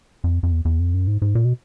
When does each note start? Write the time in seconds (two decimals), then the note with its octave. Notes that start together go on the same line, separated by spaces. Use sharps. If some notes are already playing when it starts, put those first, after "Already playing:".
0.24 F2
0.43 F2
0.52 E2
0.65 E2
0.79 F2
0.94 F#2
1.07 G#2
1.22 G#2
1.35 A#2
1.45 B2